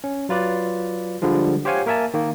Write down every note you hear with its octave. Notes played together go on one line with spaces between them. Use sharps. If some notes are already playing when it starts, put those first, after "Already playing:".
C#4
F#3 F4 B4 D5
D3 F3 G3 G#3
G4 C5 C#5 F5 F#5 G#5
A#3 A#4 E5 G#5 A5
D#3 A#3